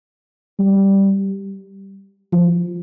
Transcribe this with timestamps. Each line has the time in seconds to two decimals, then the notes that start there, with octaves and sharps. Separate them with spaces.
0.59 G3
2.33 F3